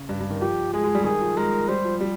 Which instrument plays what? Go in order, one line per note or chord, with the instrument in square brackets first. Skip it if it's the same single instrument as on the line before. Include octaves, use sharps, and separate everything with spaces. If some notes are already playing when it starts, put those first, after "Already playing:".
Already playing: [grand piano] C#3
G2
G2
D#3
[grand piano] F3 [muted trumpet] G4
[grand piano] G#3 [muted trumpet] G#4
[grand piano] G#3
G3
[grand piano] D#3 [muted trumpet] G#4
[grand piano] F3
[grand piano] G#3 [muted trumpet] A#4
[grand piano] G3 [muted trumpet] C5
[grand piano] F3
G3